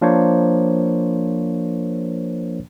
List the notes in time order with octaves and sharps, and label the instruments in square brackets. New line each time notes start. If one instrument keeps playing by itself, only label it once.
[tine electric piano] F3 A#3 D4 A#4 C5 C#5